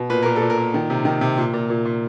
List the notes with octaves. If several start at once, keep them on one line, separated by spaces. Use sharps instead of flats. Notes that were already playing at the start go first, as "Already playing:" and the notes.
Already playing: B2
A#2 B4
A#2 A#4
A4
A#2
A#4
A#2
D#3
C3
D#3
C3
A#2
A#2
A#2
A#2